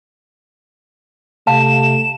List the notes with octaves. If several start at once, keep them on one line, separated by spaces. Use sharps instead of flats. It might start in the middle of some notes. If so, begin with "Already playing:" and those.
C3 A3 F5 A5 E7